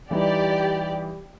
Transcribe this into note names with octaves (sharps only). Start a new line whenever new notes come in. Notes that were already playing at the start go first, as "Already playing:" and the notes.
E3 G3 D#4 G4 D5